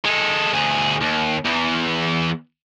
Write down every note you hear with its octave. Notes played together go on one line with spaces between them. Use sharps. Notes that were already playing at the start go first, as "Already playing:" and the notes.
G#3 A4
D2 G#4
D#2
E2 E3